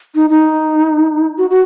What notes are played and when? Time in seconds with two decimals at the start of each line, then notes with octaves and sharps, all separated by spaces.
0.15 D#4
0.30 D#4
1.38 F#4
1.50 F#4